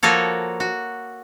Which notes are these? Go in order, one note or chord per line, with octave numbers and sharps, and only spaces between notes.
F3 A#3 F#4 A4 C#5
F#4